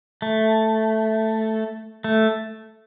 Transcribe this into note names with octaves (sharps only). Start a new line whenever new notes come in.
A3
A3